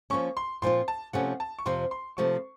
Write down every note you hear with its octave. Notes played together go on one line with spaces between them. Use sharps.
F3 A#3 C#4 C#6
C6
A#2 F3 C4 F4 C6
A5
C3 F3 A3 C#4 F#5
A5
C#6
F2 C3 F3 C4 C6
C6
C3 F3 A3 C#6